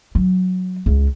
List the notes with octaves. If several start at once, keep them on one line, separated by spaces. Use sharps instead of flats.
F#3
C#2